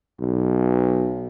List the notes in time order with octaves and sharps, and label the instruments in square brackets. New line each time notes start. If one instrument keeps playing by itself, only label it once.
[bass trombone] B1